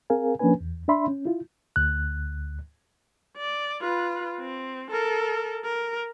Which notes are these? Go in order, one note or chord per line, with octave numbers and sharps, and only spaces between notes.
C4 G#4 A#4 F5 G#5
F3 A#3 C#4 D4 B4 G#5
E2
D4 D5 E5 B5 C6
C#4
E4 F4
D2 F#6
D5
F4 B4
C4
A4 A#4
A#4